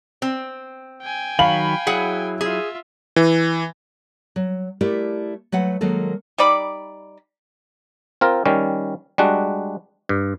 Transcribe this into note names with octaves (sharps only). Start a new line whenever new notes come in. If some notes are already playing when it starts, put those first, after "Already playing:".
C4
G5 G#5
D#3 F#3 C#5 F5 B5 F#7
F#3 E4 G#4 F#5
F4 G#4 E5
E3
F#3
A3 E4 G4 A#4 D5
F#3 A3 B4 F#5
D#3 F#3 G#3 A#3 A4
G3 D#4 D5 B5
C4 F4 A#4
D#3 G3 C#4
G3 G#3 D4 F#4
G2